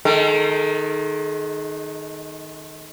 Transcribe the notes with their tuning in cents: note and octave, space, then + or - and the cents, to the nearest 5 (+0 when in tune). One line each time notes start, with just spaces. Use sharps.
D#3 +0 G#3 +35 A4 +40